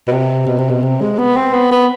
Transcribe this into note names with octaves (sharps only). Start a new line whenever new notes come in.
B2
C3
B2
C3
B2
C3
G#3
B3
C4
B3
B3